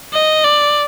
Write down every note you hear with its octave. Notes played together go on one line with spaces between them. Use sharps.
D#5
D5